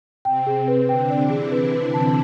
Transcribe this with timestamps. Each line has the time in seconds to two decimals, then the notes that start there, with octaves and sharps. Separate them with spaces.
0.25 C3 C4 G5
0.47 G#4
0.68 B4
0.88 D3 D4 G5
1.10 D5
1.20 E3 E4
1.30 G#4
1.52 B4
1.73 B4
1.94 A5